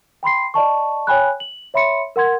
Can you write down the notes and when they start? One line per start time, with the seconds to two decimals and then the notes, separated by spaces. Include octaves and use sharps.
0.23 G5 B5 C6 C7
0.54 D5 D#5 A5 C#6
1.07 C#5 G5 G#5 B5 F#6
1.40 F#7
1.74 C#5 E5 B5 C6 C#7
2.16 A#4 F#5 C6 G#6